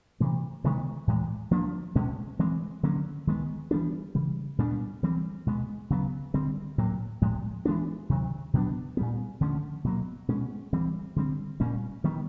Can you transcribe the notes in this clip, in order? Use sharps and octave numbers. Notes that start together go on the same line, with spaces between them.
C3 E3 A3
C3 D#3 G#3 B3
A2 E3 G#3
F3 A#3 D4
B2 G#3 C#4
E3 G#3 C4
D3 F#3 A#3 C#4
D#3 G#3 B3
E3 G3 B3 D4
C#3 E3 G3
A#2 G3 B3 D4
E3 G3 C4
B2 G#3 B3
C#3 F#3 B3
D3 G3 C4
A2 F#3 A#3
A2 F3 G#3
E3 G#3 B3 D4
C3 D#3 F#3
B2 F#3 B3 D4
A#2 G3 B3
D3 F3 A3 C#4
B2 F#3 A#3
B2 G#3 C#4
E3 G3 C4
D3 G3 C4
A#2 G3 A#3 C#4
D#3 G3 B3